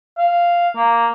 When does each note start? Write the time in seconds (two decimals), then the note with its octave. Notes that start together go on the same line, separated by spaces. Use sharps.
0.18 F5
0.76 A#3